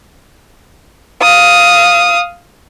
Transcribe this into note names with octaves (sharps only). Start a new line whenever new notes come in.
F5 D#6